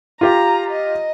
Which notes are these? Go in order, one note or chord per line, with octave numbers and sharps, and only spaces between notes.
F4 G4 F5 A#5
D#5